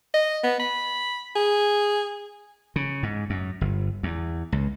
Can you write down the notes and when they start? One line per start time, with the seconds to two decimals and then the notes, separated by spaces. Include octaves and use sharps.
0.14 D#5
0.44 B3
0.59 B5
1.36 G#4
2.76 C#3
3.03 G#2
3.30 F#2
3.61 G1
4.03 E2
4.52 C#2